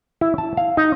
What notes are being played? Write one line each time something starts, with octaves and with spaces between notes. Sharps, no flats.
E4
A5
F5
D#4